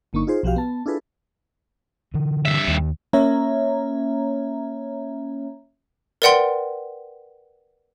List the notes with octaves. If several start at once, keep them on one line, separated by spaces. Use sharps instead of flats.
G1 D3 A#3 D#4 C#6
D#4 F4 G#4 C5
B1 F3 F#4 G4 F5
B3 A5
D4 E4 F4 G#4 A4 B4
D3 E3
G2 E5
D#2 D#3
A#3 C#4 C#5 E5 A#5
A#4 B4 D5 F#5 G5 C6